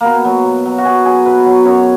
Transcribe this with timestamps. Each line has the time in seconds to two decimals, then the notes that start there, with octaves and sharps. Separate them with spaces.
0.01 B2 A#3 B3
0.25 F#3
0.45 B2
0.66 F#3
0.78 F#4
0.85 B2 G#4
1.05 F#3 G#4
1.26 B2 B4
1.46 F#3
1.65 F#2 C#5